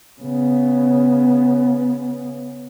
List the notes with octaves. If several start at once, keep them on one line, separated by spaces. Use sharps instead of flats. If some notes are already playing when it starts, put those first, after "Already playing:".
C#3 B3